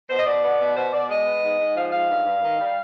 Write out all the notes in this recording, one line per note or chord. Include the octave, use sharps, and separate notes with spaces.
B2 C5
D#5
B2 D5
B3
B2
B2 C5
B2 D5
G#3 D#5
B3
G#2
G#2
F3 F5
G#2 F5
G2
G2
D#3
G3